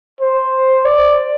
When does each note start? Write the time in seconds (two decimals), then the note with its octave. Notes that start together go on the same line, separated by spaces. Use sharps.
0.21 C5
0.85 D5